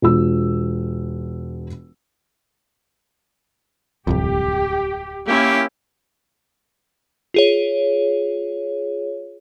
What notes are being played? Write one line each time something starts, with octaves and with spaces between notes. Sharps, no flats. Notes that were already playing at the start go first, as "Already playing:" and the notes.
E1 F4 E6
D1 C2 F2 G4
A#3 C#4 E4 G4
F4 G#4 C#5